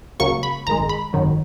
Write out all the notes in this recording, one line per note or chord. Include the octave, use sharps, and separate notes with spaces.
C#2 C#3 F#3 A#3 C#6
B5
G#1 F#2 D#3 G#3 A#5
B5
G#1 F#2 D#3 F#3